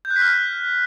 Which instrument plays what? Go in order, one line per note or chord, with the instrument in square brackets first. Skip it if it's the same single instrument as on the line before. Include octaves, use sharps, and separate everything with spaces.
[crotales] G6
F#6
B6
F6